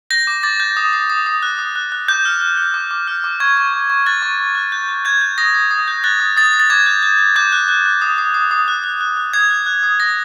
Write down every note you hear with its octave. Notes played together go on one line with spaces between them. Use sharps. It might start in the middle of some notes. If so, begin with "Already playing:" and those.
G6 A#6
D6
D6 A6
G6
D#6
D#6
D#6
D#6
F#6
D#6
F#6
F#6
D6 G6
F6
F6
F6
D6
D6
F6
D6
C#6 G#6
C#6
C#6
C#6
F#6 A6
C#6
C#6
F#6
G6
G6
G6 G#6
G6
D#6 A#6
D#6
D#6
G6
F#6 A6
D#6
D#6 A6
D#6
A6
D6 G#6
G6
G6
G6
D6 G6
F#6
F#6
F#6
D#6
D#6
D#6
D#6
F#6
F#6
F#6
F#6
D#6 G#6
F#6
F#6
D#6
D#6 A#6